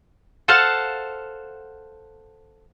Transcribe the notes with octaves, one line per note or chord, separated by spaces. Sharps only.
A4 C5 F5 F#5 A5